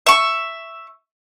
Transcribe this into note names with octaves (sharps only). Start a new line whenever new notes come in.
E5 C#6